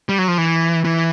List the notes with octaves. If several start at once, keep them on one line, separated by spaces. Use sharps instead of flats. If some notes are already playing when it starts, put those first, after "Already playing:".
G3
F#3
F3
E3
E3